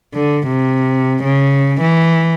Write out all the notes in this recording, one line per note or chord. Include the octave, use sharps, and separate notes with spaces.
D3
C3
C#3
E3